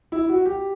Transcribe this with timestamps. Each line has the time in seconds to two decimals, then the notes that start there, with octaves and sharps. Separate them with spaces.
0.12 E4
0.29 F#4
0.46 G4